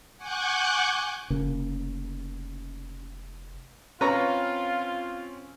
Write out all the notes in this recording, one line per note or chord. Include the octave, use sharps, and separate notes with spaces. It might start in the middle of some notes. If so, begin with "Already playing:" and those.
F#5 G#5 C#6 D6 F#6 G6
F1 C#3 A#3
C4 C#4 F4 B4 A#5 C#6